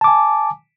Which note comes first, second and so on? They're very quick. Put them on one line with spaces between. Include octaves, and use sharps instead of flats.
A5 D6 G#5